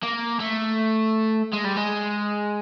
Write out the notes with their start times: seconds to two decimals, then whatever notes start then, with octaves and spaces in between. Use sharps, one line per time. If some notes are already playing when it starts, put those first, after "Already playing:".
0.03 A#3
0.40 A3
1.53 G#3
1.65 G3
1.76 G#3